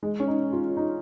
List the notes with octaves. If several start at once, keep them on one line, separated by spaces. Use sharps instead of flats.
G#3
C#4
D#4
F4
D#4